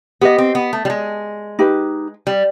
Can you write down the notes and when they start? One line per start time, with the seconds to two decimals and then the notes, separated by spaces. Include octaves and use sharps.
0.21 B3 G4 B4 D#5
0.38 C4
0.55 B3
0.73 A3
0.85 G3
0.90 G#3
1.59 D#4 G4 B4
2.27 G3